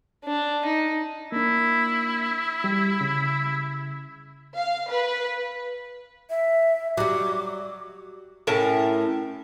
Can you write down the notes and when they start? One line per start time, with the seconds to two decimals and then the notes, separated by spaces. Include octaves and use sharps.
0.25 D4
0.65 D#4
1.32 A#3 D4 E4
2.64 G3 G4
3.01 C#3
4.56 F5
4.90 B4
6.30 E5
6.97 F#3 G3 D6
8.47 A2 C#4 A#4 A5